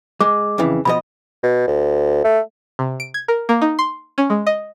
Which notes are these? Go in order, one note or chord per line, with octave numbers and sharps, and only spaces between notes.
G#3 D6
F2 C#3 E3
B2 F3 D#5 B5
B2
D2
A3
C3
D7
G#6
A#4
A#3
D#4
C6
C#4
G#3
D#5